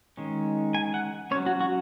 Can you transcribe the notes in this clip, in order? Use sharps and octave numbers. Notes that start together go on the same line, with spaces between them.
D#3 G#3 C#4
G#5
F#5
F#3 C#4 C#5
F#4
F#4